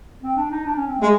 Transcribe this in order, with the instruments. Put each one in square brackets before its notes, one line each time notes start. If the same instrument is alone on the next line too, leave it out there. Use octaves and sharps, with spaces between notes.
[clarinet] C4
D4
D#4
D4
C#4
C4
[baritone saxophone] G#3 [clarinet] A3